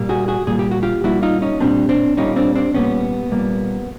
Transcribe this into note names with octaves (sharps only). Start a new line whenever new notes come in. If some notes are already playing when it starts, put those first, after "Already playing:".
Already playing: A#2 G3 A#3
F#4 G#4
F#4 G#4
A#2 G3 A#3 G#4
G4
F#4
F4 G4
A#2 G3 A#3 E4 F#4
D#4 F4
C#4 D#4
A#2 G3 A#3 C4 D4
C4 D4
A#2 G3 A#3 C#4 D#4
C4 D4
C4 D4
A#2 G3 A#3 B3 C#4
A#2 G3 A#3